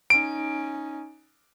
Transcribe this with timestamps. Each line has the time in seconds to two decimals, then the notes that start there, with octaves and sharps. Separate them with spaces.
0.10 C#4 D#4 D7